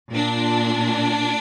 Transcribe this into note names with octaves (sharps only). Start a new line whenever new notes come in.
A#2 D4